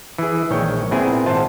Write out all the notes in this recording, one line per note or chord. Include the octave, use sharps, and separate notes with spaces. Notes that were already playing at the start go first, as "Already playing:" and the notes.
E3 G#4
A#1 D#3 G#3 C#5 G5
A#2 B3 C4 E4 G#4 G#5
G#1 F4 C5 F#5 A5